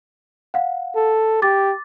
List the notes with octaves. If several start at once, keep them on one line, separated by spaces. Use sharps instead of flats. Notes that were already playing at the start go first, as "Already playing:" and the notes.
F5 F#5
A4
G4 D6 A6